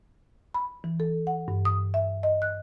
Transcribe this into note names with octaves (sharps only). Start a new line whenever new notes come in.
B5
E3
A4
F#5
G2
D#6
E5
D#5
F#6